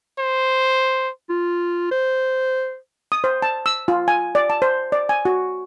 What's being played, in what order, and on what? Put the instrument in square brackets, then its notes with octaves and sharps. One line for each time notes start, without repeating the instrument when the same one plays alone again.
[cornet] C5
[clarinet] F4
C5
[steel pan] D#6
C5
A5
E6
F4
G#5
D5
A5
C5
D5
G#5
F#4